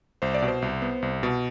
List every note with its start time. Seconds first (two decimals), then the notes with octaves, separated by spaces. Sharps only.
0.22 C2 C5
0.34 D5
0.42 B2
0.48 C5
0.62 C2
0.82 B3
1.02 C2
1.23 B2